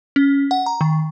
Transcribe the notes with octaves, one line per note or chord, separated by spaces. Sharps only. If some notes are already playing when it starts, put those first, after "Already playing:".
C#4
F#5
A#5
D#3